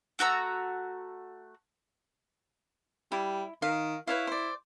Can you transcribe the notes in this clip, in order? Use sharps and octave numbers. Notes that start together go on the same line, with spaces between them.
A3 F#4 A#5 E6
G3 E4
D#3 F5
E4 B4 C#5 F5
C5 D5